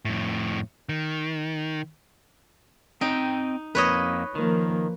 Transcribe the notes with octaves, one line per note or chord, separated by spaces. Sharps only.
F2 A2
D#3
C4 D#4 D#5 G5
F2 A#3 B4 C#5 D#5
D#3 F3 A#3